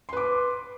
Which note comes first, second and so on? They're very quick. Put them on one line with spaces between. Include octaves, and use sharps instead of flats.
C6 B4 D6